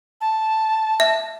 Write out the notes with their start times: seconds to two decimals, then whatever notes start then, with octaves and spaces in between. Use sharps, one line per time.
0.21 A5
1.00 E5